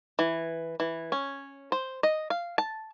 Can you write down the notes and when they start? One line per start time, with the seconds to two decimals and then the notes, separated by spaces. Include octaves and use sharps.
0.19 E3
0.80 E3
1.12 C#4
1.72 C5
2.03 D#5
2.30 F5
2.58 A5